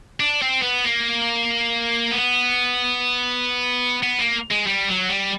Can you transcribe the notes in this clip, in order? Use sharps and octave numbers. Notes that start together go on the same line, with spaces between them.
D4
C4
B3
A#3
B3
B3
A#3
G#3
G3
F#3
G3